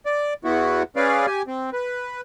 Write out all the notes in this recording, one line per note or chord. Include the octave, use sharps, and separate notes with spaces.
D5
E2 B3 E4 F#4
C#4 G#4 B4 D5 F5
G4 G#5
C4
B4